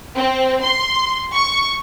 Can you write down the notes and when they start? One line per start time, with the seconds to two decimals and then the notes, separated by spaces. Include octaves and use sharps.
0.15 C4
0.64 C6
1.35 C#6